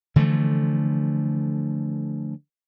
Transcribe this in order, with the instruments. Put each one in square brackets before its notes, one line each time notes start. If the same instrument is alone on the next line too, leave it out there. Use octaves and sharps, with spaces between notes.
[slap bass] D3 E3 F3 A3